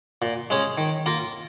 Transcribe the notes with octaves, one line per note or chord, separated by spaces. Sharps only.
A#2
G#3 C#4 G#4
D#3
A#3 F4 A#4